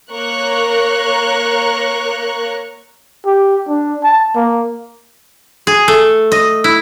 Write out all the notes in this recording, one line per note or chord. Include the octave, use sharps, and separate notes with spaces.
A#3 A#4 C#5 A#5 C#6 F#6
G4
D4
A5
A#3
G#4
A3
D#5
E4